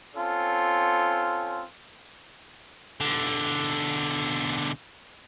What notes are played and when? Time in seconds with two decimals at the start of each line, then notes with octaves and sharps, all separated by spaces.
0.16 C4 C#4 F4 A4
3.01 B1 D3